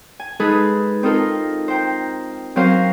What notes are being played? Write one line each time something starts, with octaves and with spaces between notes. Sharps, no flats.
G#5
G#3 D#4 G#4 A4 B4
C4 D#4 F4 A4 A#4
C5 G5 A#5
F#3 C4 C#4 A#4 C5 F5